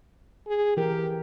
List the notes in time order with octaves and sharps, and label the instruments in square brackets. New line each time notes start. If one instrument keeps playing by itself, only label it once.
[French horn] G#4
[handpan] E3 A#4 [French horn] G4